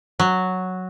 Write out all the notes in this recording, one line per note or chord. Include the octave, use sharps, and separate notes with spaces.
F#3